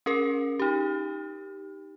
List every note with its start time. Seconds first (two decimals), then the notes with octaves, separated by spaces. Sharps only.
0.06 C#4 G#4 A#4
0.59 D#4 G4